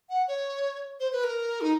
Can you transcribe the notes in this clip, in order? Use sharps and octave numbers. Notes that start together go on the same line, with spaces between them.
F#5
C#5
C5
B4
A#4
D#4